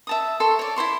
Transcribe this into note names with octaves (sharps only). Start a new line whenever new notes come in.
E5 A5 D#6
A4 E5 C6 C#6
C#5 D5
E4 C5 C6 C#6